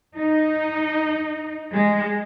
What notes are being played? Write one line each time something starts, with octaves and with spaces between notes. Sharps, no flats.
D#4
G#3